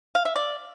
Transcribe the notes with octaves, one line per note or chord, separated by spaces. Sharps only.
F5
E5
D5